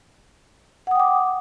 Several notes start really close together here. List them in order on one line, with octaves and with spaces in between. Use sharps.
F#5 D#6 G5 D6